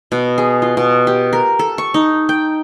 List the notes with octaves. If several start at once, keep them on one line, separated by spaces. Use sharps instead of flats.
B2
G#4
F4
B2
G4
A#4
A4
C#6
D#4
G5